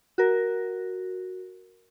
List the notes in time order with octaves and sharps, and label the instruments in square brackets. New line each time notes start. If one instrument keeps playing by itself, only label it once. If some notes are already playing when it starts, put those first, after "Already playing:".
[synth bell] F#4 A#4